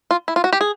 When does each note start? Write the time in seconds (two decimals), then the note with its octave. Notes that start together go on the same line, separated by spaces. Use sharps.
0.11 F4
0.28 E4
0.36 F4
0.44 F#4
0.53 G4
0.61 G#4